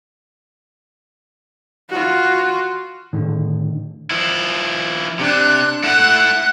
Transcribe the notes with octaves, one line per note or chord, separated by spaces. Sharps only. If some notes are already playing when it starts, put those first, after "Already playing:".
F4 F#4
A2 D3 D#3
F3 E4
C3 D4 F#6
A3 E4 F#5 F#6